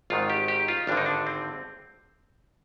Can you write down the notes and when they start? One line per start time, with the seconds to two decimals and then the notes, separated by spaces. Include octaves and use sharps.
0.10 G#1 G#2 D#3 F4
0.30 G4
0.48 G4
0.68 F4
0.87 G#1 G2 D3 D4
0.97 D#4
1.06 D4
1.27 C4